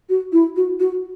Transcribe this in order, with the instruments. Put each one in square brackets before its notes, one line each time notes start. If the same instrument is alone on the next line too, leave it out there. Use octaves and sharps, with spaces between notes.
[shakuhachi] F#4
E4
F#4
F#4